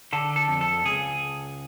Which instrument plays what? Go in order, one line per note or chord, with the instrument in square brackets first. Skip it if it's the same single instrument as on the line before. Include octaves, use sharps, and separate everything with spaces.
[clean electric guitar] D3 A4
A4
F2
A4
C#2 G#4